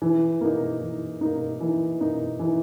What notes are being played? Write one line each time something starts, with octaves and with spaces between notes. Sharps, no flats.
E3
A#3 D#4
E3
A#3 D#4
E3
A#3 D#4
E3